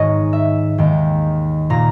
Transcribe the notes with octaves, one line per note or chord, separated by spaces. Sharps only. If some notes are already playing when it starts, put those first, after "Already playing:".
Already playing: G#2 D#3 G#3 C#5 D#5
E5
D#2 D#3 G#3 G5
A#2 A#3 A#5